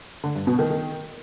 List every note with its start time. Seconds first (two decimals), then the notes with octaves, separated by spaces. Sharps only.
0.24 D3
0.35 G2
0.47 B2
0.59 D#3
0.70 D#3